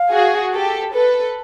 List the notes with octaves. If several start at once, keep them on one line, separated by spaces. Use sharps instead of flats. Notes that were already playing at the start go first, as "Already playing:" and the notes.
Already playing: F5
F#4 G#4
G4 A4
A4 B4